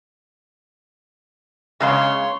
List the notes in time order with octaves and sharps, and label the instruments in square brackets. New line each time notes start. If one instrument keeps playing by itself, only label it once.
[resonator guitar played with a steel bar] C#3 G#3 F5 [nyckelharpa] C#5 C6